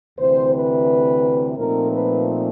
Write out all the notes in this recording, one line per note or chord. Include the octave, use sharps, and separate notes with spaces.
D2 C3 E3 C5
B4
A#2 F3 A3 C4 D#4 A#4
B4